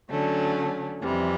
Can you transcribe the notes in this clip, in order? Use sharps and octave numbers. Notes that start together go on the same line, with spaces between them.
D3 F#3 A3 C#4
F2 C3 E3 G3